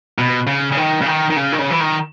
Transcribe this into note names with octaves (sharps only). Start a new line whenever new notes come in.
B2
C#3
C#3
D#3
C#3
D#3
D#3
C#3
D#3
C#3
E3
D#3